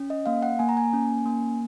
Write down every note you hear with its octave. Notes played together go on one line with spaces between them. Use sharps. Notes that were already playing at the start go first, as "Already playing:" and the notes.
Already playing: C#4
D#5
A#3 F5
F#5
A#3 G#5
A#5
G#5
C#4
A#3